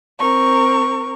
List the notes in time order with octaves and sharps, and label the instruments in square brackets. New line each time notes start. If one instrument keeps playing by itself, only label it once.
[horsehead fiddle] C4 A#4 [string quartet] C#6